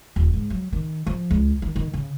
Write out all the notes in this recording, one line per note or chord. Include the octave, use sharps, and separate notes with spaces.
D#1
G#2
F#3
D#3
F3
C#2
D#3
D#3
C#3